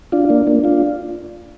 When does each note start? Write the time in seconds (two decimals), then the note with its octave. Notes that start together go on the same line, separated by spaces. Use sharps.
0.12 D4 F4
0.29 A#3 D4
0.47 A#3 D4
0.64 D4 F4